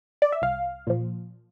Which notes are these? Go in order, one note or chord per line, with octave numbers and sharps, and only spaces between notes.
D5
E5
C2 F5
A#2 F3